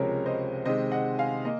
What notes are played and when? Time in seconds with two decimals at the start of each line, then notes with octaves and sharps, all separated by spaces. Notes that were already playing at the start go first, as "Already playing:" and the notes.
Already playing: C#2 C3 F3 G#3 C#4 A#4 C#5
0.26 C5 D#5
0.65 C3 D#3 G#3 C5 D#5
0.92 D#5 F#5
1.18 F5 G#5
1.45 A#3 D#5